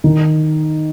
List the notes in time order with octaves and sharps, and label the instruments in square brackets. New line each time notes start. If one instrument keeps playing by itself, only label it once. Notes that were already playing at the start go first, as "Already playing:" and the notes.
[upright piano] D#3 D#4